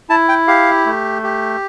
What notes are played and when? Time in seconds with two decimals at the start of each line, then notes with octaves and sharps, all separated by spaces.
0.10 E4 A5
0.29 G5
0.48 G4 F5
0.86 A3
1.23 G4